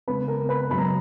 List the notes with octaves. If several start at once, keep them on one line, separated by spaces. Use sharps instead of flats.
C#3 G#3 B3 B4 B5
A#4 A#5
B4 B5
F#2 C#3 G#3 B5
A#5